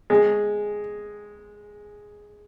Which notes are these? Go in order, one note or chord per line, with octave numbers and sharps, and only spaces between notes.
G#3